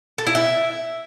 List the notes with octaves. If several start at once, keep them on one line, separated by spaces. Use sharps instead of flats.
A4
E4
E5